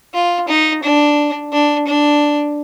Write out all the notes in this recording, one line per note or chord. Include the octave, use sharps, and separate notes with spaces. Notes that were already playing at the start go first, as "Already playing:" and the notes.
F4
D#4
D4
D4
D4